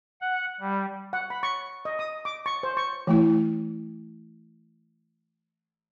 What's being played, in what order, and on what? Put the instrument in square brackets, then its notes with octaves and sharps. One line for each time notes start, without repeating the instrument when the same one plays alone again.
[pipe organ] F#5
G3
[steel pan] F#5
B5
C#6
D#5
D#6
D6
C#6
C5
C#6
[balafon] E3 A3 E4